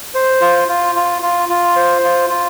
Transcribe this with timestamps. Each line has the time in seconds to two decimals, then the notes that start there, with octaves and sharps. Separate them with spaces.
0.14 C5
0.41 F4
0.68 F4
0.95 F4
1.22 F4
1.49 F4
1.76 C5
2.03 F4
2.30 F4